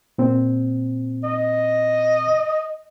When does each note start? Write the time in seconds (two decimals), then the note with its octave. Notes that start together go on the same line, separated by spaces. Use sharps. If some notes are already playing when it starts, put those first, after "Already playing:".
0.18 A#2 C4
1.24 D#5